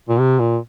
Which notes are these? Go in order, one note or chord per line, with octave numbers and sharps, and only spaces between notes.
A#2
C3
A#2